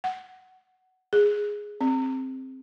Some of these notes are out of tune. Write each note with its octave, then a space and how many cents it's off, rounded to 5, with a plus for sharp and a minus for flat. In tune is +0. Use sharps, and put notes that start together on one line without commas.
F#5 +10
G#4 -5
C4 +5